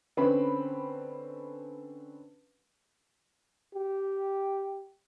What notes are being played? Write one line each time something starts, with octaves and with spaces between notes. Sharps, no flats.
D3 C4 C#4 B4 B5
G4